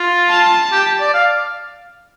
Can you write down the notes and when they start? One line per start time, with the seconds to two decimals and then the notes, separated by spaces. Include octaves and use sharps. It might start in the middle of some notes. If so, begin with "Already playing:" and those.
Already playing: F4
0.30 A5
0.72 G4
1.01 D5
1.14 F5